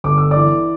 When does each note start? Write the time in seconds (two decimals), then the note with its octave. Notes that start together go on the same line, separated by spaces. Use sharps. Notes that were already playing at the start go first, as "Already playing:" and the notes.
0.04 G1 D6
0.18 E6
0.31 E3 D5 D6